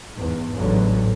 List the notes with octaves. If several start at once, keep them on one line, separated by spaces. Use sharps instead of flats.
E2 G#2
A1 E2 G#2 D3 F#3